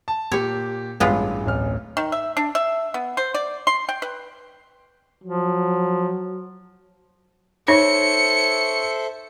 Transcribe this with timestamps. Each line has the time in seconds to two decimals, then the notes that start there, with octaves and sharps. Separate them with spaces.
0.08 A5
0.32 A#2 G4 C#5
1.00 A1 G2 G#3 B3 F4
1.46 D1 A1 F6
1.97 D#3
2.12 E5
2.37 D4
2.55 E5
2.94 B3
3.17 C5
3.34 D5
3.67 C6
3.89 G5
4.02 B4
5.24 F3 F#3
7.68 D#4 A4 C5 C#5 E5 C#7